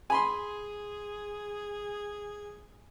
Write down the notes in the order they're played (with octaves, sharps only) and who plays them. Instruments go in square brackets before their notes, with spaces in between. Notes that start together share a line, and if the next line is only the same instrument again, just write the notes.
[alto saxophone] G#4 [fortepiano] G#5 B5 C6